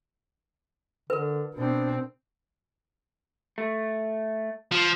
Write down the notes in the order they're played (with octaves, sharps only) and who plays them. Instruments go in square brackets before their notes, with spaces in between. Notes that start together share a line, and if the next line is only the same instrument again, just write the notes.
[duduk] D3 [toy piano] A#4 B4
[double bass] B2 C4 [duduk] D4
[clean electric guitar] A3
[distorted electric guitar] F3